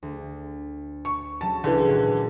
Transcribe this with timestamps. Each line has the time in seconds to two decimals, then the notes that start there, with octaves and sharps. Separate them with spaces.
0.03 D2
1.05 C#6
1.41 F#3 C#4 A5
1.64 C#2 D3 E3
1.88 A#2 D#3